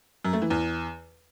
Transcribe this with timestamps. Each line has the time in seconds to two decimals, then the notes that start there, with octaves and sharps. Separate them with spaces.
0.25 F#2
0.33 A3
0.42 E3
0.50 E2